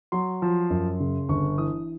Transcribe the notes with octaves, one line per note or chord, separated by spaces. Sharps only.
F#3 C6
F3
F#2
C#3
G1 C#6
E3 D#6